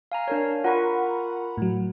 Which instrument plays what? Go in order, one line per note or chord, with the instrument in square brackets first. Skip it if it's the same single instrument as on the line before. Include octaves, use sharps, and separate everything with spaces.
[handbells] F5 G#5 A#5
D4 A#4 C#5
[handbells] F4 A#4 C#6 [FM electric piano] F#5 A#5 B5
[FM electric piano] A2 F#3